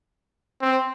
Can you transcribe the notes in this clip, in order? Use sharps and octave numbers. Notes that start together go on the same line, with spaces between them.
C4